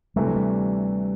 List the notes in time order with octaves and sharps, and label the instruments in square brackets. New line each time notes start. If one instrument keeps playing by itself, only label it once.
[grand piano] D2 C3 E3 A3 [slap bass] G3
[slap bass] F#3
G3